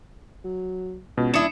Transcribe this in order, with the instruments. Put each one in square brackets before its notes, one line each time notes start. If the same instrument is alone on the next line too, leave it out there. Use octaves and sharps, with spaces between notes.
[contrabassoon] F#3
[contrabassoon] C#2 [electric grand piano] B2
[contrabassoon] D#1 [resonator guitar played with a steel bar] D4 E4 [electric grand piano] D#6 C#7 E7